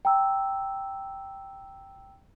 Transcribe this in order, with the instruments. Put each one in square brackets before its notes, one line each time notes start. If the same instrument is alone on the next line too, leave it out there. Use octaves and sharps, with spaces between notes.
[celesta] G5 A#5 E6